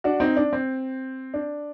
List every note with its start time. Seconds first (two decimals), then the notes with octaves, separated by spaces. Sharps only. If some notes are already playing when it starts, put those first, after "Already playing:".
0.04 D4 F#4
0.20 C4 D#4
0.37 D4
0.53 C4
1.34 D4